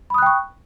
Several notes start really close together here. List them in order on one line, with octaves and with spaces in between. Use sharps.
B5 D#6 F#6 G5 C#6